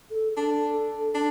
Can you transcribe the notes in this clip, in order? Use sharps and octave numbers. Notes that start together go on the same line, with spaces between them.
A4
D4 A4
D4